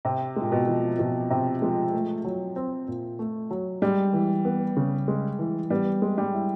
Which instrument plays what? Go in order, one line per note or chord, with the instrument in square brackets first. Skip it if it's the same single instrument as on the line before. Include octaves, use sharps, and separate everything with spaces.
[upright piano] C3 [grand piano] C4
[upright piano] A#2 [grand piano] G#3
[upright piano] B2
[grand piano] F3
[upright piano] B2 [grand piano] F3
[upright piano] C3 [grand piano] C4
[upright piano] F3 [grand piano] G#3
[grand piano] A3
F#3
C4
A#2
A3
F#3
[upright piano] G3 [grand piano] G#3
[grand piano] E3
B3
C#3
G#3
E3
[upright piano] G3 [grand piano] B3
[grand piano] G#3
[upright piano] G3
[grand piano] E4